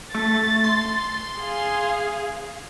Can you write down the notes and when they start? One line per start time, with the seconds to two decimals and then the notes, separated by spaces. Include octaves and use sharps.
0.14 A3 A6
0.64 C6
1.40 G#4 F5